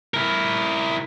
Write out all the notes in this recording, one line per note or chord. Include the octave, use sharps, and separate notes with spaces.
E4 A#4